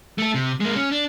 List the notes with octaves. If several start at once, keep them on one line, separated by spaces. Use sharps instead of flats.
A3 A4
C3
G#3 A#3
C#4
D4